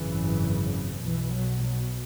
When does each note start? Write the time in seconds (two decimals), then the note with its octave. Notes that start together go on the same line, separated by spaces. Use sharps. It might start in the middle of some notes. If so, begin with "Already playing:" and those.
Already playing: G#1 F#2 C#3 E3
1.04 B1 B2 E3
1.33 F#3
1.62 F#3